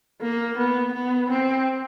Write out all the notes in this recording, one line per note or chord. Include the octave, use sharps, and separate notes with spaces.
A#3
B3
B3
C4